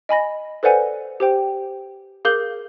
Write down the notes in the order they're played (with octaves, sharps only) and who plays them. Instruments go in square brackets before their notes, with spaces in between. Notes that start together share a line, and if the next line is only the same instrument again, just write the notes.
[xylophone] D#5 G#5 B5 A#6
A4 B4 C5 D5 F#5 G#5
G4 C5 G5
G#4 A#4 F5 D6 G6 G7